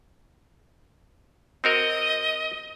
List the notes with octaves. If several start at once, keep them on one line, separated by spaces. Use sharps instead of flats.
C4 F#4 A#4 D#5